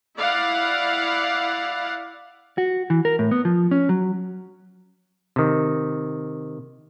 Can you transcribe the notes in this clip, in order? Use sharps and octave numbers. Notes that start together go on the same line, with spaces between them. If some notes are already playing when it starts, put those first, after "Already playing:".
E4 D5 F5 F#5
F#4
E3
A#4
A2
B3
F3
C#4
F#3
C3 D#3